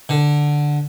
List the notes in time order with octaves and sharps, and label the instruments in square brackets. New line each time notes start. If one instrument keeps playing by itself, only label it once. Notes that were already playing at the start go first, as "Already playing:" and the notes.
[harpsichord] D3